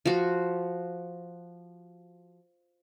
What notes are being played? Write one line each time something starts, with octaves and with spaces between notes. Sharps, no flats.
F3 F#4